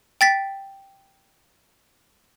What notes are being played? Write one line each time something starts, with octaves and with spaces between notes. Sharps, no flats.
G5 A6 B6